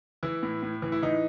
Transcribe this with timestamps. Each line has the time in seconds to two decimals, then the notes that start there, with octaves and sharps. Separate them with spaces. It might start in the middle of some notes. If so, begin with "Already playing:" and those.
0.23 E3 E4
0.43 A2
0.63 A2
0.82 E3
0.92 E4
1.02 E3 D#4